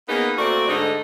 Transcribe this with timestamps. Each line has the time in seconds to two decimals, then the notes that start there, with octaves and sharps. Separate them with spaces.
0.08 A#3 B3 C#4 D#4 G#4 B4
0.37 A3 A#3 C4 F#4 D5
0.67 G#2 D3 A3 D#4